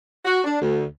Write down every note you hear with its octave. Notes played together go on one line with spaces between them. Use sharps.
F#4
D4
D2